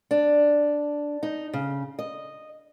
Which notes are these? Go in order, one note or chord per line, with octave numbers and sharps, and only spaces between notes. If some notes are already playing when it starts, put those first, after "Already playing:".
D4
D#4
C#3
D#5